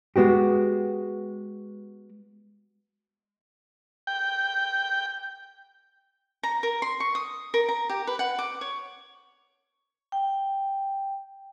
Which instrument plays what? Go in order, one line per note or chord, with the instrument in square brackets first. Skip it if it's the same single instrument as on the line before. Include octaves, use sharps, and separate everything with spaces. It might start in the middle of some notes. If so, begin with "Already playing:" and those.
[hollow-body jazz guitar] G#3 B3 F#4 G4
[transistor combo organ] G5
[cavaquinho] A#5
A#4
C6
C#6
D#6
A#4
A#5
G4
B4
F#5
D6
C#5
[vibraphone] G5